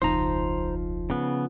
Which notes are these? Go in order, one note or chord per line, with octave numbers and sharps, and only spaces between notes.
E1 C#2 F3 D#4 C5 A#5
C#3 B3